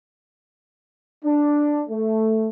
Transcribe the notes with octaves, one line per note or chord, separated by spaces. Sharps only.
D4
A3